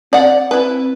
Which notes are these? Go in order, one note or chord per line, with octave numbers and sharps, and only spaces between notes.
C4 D5 F#5
E4 B4